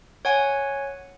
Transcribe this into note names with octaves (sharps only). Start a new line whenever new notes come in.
C#5 F#5 G#5